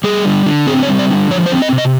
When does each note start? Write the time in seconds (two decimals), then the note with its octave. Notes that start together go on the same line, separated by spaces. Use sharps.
0.04 G3 G#4
0.25 D3
0.46 D3
0.67 C4 G#4
0.83 C#5
0.88 G3
0.99 D5
1.09 D3
1.31 F3 C#5
1.46 C5
1.52 C4
1.62 D#5
1.72 C3
1.78 D#5